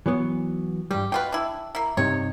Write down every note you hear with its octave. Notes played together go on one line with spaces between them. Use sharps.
E3 F#3 B3
G2 G3 G4
B2 F4 B4 G5
D4 E4
A#3 E4
G2 C3 D#4 C#5